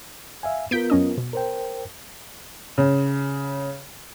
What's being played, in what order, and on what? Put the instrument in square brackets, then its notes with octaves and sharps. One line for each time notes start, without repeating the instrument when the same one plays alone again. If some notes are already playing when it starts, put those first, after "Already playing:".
[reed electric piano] E5 F5 G#5
[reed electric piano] B3 F4 A#4 [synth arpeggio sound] G6 B6 D7
[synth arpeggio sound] F#2 C#4 D#5
B2
[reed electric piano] A#4 C5 G5
[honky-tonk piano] C#3